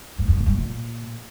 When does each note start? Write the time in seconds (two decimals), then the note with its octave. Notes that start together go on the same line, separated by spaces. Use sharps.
0.18 G#2
0.28 F2
0.37 B2
0.46 G2
0.56 A#2